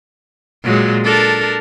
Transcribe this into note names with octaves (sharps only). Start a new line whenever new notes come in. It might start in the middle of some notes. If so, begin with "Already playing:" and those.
A#2 F#3 G#3
D4 A4 A#4